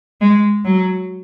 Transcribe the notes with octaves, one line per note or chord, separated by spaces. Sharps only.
G#3
F#3